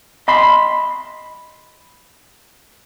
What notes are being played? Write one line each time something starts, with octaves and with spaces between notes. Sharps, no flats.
D#5 B5 C6